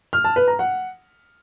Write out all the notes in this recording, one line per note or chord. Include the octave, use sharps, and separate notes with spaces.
F6
A5
B4
A#5
F#5